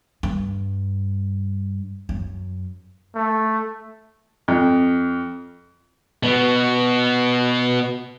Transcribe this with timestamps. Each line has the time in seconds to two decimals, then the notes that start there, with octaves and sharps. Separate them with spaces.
0.23 G2
2.09 F#2
3.15 A3
4.48 F2
6.23 B2 B3